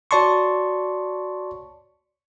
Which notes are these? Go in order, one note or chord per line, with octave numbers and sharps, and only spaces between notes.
F#4 C#5 D5 A5 C6 C#6